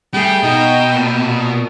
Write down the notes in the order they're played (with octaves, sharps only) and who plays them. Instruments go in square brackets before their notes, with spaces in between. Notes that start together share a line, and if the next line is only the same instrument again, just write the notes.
[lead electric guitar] G3 [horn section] A3 G#4 [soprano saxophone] G5
[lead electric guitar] B2 [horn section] D#4
[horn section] A#2